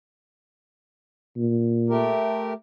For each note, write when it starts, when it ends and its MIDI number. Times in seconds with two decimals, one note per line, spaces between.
1.37 2.13 46
1.89 2.53 57
1.89 2.53 67
1.89 2.53 70